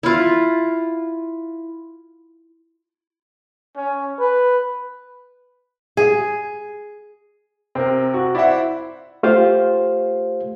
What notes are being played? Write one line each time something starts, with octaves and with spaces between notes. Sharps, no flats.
E4 F4
C#4
B4
G#4
C3 C4 A#4
F#4
E4 C5 D5 E5 F#5
A3 F4 G4 C5 F5